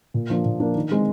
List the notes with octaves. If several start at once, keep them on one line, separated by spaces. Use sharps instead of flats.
A#2
F3 A#3 D4
A#2
F3 A#3 D4
D#3
G#3 C4